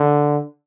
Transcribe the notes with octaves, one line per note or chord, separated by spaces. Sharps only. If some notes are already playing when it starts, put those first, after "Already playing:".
Already playing: D3